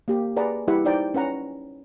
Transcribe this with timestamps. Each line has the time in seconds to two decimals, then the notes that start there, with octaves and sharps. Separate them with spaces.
0.08 A#3 G4
0.36 G#4 B4 D5 F#5 A#5
0.68 G3 E4 G4 B4 E5 F#5
0.85 D#4 C5 D5 G5 A#5
1.14 C#4 B4 F#5 A#5